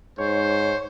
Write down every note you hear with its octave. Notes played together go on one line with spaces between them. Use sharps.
G#2 C5 C#5